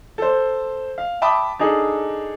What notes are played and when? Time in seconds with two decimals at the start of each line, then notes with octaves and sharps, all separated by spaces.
0.18 A4 C5
0.98 F5
1.22 E5 G5 A5 B5 D6 D#6
1.59 D4 D#4 G#4 A4